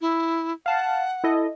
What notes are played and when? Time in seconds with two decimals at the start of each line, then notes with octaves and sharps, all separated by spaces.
0.01 E4
0.66 F5 F#5 A5
1.24 E4 A4 D#5